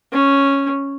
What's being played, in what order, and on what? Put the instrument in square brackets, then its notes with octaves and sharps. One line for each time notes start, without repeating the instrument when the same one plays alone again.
[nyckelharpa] C#4